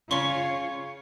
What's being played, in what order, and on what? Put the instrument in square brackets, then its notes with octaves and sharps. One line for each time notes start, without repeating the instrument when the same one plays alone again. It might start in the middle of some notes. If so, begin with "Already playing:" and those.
[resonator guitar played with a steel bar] C#3 C#4 [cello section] F4 C#5 [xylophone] C6 C#6